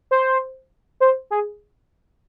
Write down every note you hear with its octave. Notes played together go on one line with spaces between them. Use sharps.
C5
C5
G#4